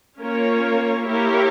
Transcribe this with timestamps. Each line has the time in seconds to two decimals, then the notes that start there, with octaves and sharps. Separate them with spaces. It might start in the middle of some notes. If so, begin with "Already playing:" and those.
0.18 A#3 C#4 F4 A#4 C#5
1.06 A#3 E4 G4 A#4 C#5